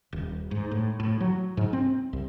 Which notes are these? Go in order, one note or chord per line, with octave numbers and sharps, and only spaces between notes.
D#1
G#2
A2
A2
F#3
G#2
C4
C2